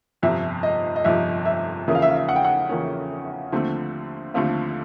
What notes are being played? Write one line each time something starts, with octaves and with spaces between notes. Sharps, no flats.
G1 F2 C3 F3 E5
D#5
D#5
G1 F2 C3 F3 E5
E5
E2 C#3 F3 A#3 C#4 E5
F5
E5
F5
E5
F#5
G5
F#5
E2 C#3 F3 A#3 C#4
D#2 D3 F3 A3 C4
D#2 D3 F3 A3 C4 F5